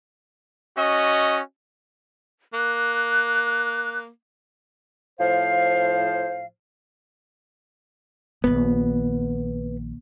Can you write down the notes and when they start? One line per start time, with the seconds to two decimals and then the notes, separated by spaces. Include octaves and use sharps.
0.76 C#4 F#4 D#5
2.54 A#3 F#6
5.20 A2 F3 C5 F5
8.44 A#1 D#3 B3